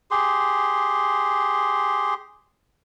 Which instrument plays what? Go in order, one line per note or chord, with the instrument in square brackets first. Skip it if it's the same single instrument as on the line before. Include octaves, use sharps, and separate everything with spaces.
[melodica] G4 G#4 C6